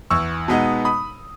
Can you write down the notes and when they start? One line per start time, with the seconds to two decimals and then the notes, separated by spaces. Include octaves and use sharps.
0.10 E2 C#6 E6
0.48 B2 G#3 B3 D#4
0.85 B5 D#6